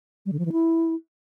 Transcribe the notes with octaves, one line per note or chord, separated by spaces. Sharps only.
G3
D3
F3
E3
E4